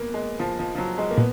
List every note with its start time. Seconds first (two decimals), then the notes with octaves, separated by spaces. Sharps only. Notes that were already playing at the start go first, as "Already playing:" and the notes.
Already playing: A#3 B3
0.14 G#3
0.39 F3
0.59 F3
0.75 F3
0.78 F#3
0.98 G#3
1.11 A#3
1.17 A#2 B3